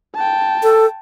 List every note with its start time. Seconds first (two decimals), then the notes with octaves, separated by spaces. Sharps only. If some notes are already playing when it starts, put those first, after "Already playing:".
0.15 G5 A5
0.63 A4